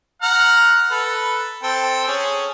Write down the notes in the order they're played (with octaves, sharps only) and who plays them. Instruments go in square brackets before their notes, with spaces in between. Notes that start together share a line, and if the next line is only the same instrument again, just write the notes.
[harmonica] F#5 A#5 F6
A4 B4
C4 A4 G5
C#4 G#4